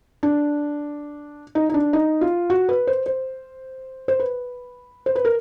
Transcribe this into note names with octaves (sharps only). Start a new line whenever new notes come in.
D4
D#4
D#4
D4
D#4
F4
F#4
B4
C5
C5
C5
B4
C5
B4
A#4